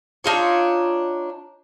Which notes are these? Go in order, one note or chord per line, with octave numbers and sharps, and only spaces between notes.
D4 D#4 F4 C#5